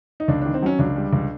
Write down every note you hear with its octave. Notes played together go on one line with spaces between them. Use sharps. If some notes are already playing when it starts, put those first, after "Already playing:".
D#4
C#2 D4
D#3 D4
C4
F#3 C#4
C#2 D4
G3
C#2